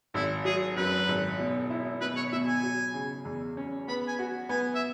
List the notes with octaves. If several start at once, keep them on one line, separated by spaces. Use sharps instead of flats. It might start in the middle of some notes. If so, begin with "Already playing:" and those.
G#1 E4
F#3 G#4
F#2 B4
G#1
B2
E4
B2 B4
C#5
B2 E5
G#5
F#3
C#3
E2
C#4
B3 B5
G#5
F#4
B3 G#5
E5